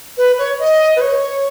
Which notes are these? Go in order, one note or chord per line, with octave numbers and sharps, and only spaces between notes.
B4
C#5
D#5
B4
C#5